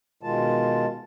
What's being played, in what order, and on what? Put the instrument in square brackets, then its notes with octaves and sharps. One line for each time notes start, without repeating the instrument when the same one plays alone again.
[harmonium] B2 D#3 G#3 F4 A5